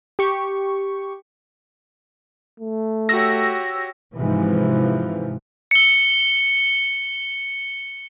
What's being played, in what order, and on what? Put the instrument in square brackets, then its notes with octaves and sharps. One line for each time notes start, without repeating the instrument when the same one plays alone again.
[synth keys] G4 C#6
[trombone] A3
[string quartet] F#4 G4 C#5 [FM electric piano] E6 A#6
[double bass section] G#2 C3 E3 F3
[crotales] C#7 G7